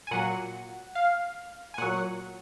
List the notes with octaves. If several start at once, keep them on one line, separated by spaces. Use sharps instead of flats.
G#5
A#2 F#3 F#5
F5
G#5
A#2 F#3 F#5